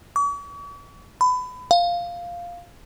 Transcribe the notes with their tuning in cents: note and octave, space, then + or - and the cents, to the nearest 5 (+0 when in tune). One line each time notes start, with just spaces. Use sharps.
C#6 +45
B5 +25
F5 +0